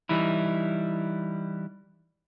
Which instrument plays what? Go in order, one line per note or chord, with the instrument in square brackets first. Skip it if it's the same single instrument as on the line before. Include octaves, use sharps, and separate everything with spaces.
[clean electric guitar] E3 G3 D#4 E4